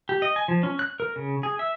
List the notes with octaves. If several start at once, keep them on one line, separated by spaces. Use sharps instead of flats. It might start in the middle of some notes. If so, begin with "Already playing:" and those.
G4
D#5
G#5
F3
C#4
F#6
A#4
C#3
G#4
E5